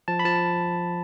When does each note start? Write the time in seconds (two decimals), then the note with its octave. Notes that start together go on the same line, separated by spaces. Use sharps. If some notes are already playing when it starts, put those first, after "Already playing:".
0.08 F3 A5
0.19 B5
0.25 F3 A5